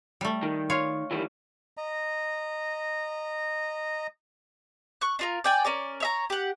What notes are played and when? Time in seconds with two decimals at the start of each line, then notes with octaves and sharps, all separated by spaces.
0.21 G3 A3
0.43 D#3
0.70 F4 C#5 F5
1.11 D#3 E3 G3
1.77 D#5 A#5
5.01 C#6 F#6
5.19 D4 F4 A#4
5.44 D5 G5 G#5
5.65 C#4 A#4 D5
6.00 C#5 E5 A#5
6.30 G4 F#5